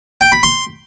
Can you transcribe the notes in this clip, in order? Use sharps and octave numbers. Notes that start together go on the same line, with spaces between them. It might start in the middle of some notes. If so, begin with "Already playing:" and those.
G5
B5
C6